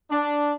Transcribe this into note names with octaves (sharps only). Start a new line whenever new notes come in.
D4